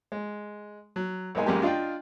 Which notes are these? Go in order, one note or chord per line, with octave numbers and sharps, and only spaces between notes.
G#3
F#3
B1 G#3 A#3 D#4 G#5
A1 F#2 G#3 A#3 G4 G#5
D4 F4 D#5 F5 G5